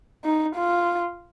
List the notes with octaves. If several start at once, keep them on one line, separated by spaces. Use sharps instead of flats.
D#4
F4